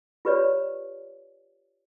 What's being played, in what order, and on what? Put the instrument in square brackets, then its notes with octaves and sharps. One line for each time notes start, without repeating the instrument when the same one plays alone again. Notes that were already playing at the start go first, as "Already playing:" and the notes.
[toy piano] F4 G4 B4 C#5 D5